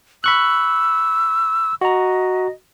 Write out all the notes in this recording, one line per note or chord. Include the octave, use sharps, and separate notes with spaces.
B5 C#6 E6 F#6
F#4 D#5 A#5